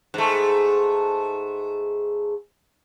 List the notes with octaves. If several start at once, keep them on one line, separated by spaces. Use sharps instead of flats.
G#2 A3